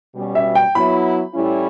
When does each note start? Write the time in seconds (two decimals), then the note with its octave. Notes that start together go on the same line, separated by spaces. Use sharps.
0.15 B2 G3 C#4
0.35 E5
0.55 G5
0.75 F#3 B3 E4 B5
1.34 A2 G3 C#4 E4